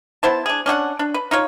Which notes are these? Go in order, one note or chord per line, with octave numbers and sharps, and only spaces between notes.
B3 E4 C5 A5
D4 G#4
C#4 D4 G4 F#5
D4
B4
D#4 F4 C#5